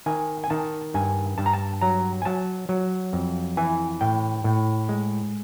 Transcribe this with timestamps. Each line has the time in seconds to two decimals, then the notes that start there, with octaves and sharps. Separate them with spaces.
0.06 D#3 G#5
0.44 G#5
0.50 D#3 A5
0.94 G2 G#5
1.38 G2 A5
1.46 A#5
1.53 A5
1.81 F#3 A#5
2.22 G#5
2.25 F#3 A5
2.69 F#3
3.13 F2
3.57 E3 G#5
4.01 A2 G5
4.44 A2
4.89 G#3